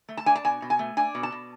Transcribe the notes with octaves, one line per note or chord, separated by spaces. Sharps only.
A3
A5
D4 G#5
A5
B2 G#5
B2
G#5
A3
D4 G#5
B2
A5
B2